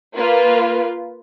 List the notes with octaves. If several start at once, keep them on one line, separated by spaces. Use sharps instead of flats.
A#3 F4 B4